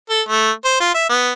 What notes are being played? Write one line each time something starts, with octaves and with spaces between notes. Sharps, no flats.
A4
A3
C5
F4
E5
B3